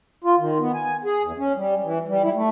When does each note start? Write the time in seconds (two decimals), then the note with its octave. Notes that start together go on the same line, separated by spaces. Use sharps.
0.24 F4
0.39 D#3
0.59 B3
0.74 G#5
1.05 G#4
1.23 E2
1.38 C#4
1.56 G3
1.84 E3
2.08 G3
2.23 E4
2.34 A3